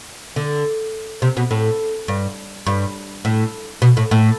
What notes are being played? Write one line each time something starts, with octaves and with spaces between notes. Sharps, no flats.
D3
C3
B2
A2
G2
G2
A2
B2
A2
A2